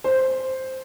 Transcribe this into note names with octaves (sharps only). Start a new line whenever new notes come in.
C5